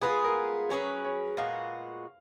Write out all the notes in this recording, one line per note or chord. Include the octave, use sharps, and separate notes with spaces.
G#3 B3 F4 G#4 B4
A#4
F#3 C#4 G#4 B4 C#5
C#5
A#2 G#3 B3 F#4 F5